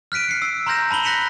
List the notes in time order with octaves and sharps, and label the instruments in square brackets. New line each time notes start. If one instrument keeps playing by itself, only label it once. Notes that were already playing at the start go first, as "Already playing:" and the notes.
[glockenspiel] F6 F#6 B6 D7 D#7
C7 C#7
E6
A#5 C6 F6 G6 A#6 E7
A5 B5 F#7 G7
F#6 A#6 B6 C#7 D#7 E7